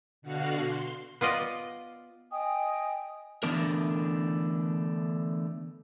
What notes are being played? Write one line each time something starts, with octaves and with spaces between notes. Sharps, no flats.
B2 D3 F#4 F5 F#6
C6
B3 F4 D5 D#5
D#5 G5 G#5 D#6
D3 E3 A3 B3 D4 A#4